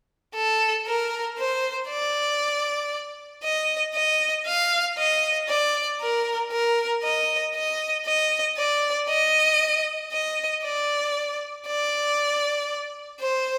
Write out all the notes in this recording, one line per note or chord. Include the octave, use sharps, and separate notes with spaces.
A4
A#4
C5
D5
D#5
D#5
F5
D#5
D5
A#4
A#4
D#5
D#5
D#5
D5
D#5
D#5
D5
D5
C5